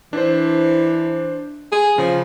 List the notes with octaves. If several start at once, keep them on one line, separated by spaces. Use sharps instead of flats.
E3 D4 C5
G#4
C#3 F3